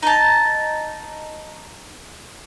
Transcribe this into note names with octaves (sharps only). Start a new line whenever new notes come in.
D#4 A5